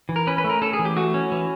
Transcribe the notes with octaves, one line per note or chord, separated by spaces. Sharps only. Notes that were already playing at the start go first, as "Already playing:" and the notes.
E3
A#4
C#4 B4
B4
A3
A#4
C#4 A4
G#4
E3
G4
A3 F#4
C#4
E3